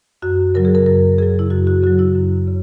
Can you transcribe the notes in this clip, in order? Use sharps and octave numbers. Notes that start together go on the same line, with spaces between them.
F#2 F#4
C#3 F#3 A#4
G#4
A#4
F#2 A#4
C#3 F#3 G#4
E4
F#2 F#4
F#4
C#3 F#3 F#4
E4
F#2
C#3